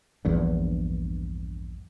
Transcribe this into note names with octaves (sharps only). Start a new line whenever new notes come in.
A#1 E2 G2